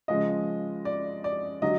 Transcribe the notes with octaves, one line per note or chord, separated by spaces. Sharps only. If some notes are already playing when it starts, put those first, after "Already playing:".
C#3 F3 G#3 D#5
D5
D5
D3 F#3 D#5